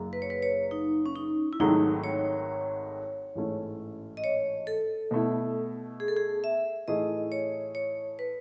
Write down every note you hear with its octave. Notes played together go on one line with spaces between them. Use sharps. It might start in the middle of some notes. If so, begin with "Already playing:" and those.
Already playing: F#1 F#2 C#3 F#3
B4
C#5
B4
C#5
D#4
C#4
D#4
E4
G#1 G#2 D#3 F#3 A3 D#4
C#5
A1 G#2 E3 A3 C#4
D#5
C#5
A4
B2 A3 E4
G#4
A4
G#4
E5
A2 E3 A3 D#4 G#4 D#5
C#5
C#5
B4